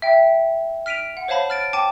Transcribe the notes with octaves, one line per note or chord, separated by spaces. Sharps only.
E5 G5
F6 B6 D7 D#7 F7
F#5
C5 C#5 F5 A5 B5
F6 A6 D7
G5 A5 D6 D#7